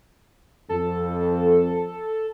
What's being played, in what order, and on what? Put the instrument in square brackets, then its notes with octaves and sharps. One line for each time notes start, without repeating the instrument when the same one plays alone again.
[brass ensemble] F2 [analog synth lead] A4